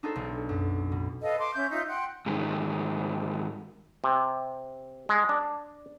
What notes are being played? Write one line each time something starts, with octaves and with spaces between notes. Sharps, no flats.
D4 D#4 F#4 G#4 A4 C5
B1
F#2
B2
A4 B4 D#5 F5
C6 D6
C#4 E5 G6
D#4 F4 E5
F#5 G5 C6 F#6
G#2 D#3 G3
C3
G#3
D4